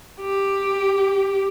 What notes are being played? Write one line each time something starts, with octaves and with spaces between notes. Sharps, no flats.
G4